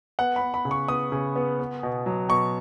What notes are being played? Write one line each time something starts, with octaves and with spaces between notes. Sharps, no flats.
B3 F#5
B5
B3
B5
C#3
C#6
B3 D#6
C#3
B3
B3
B2
F#3
B2 C#6